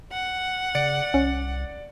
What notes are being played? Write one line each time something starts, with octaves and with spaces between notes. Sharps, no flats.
F#5
C#3 D5 C#7
C2 C#4